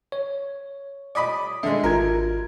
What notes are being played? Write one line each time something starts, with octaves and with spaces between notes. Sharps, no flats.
C#5
D5 D#5 B5
D3 G#3 E5
G#1 F4 A#4 G#6